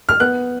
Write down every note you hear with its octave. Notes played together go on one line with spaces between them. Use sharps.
F6
B3 F#6